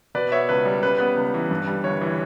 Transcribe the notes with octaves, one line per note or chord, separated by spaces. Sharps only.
B2 B4 D5
B3 C#5 E5
C#2 B4
G3
C#3 B4
B3 B4
C#2
E3
G2
G3
G1 C#5
E3